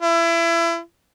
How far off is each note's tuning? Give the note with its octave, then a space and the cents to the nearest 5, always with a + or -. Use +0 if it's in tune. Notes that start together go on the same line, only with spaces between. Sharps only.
E4 +30